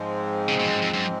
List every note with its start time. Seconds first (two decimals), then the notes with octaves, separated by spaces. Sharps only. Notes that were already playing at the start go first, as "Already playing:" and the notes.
Already playing: G#2 F3 G#3 C4
0.48 C#3
0.60 B2
0.66 F2
0.71 F#2
0.82 F2
0.94 F#2